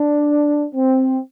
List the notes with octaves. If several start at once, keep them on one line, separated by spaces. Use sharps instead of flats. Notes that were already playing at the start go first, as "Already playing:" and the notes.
Already playing: D4
C4